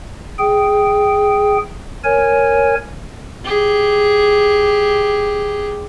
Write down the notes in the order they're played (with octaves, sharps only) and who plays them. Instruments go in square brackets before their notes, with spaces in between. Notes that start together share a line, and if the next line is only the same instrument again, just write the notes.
[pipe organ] G#4 G5
A#4 C#5 G#5
[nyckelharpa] G4 G#4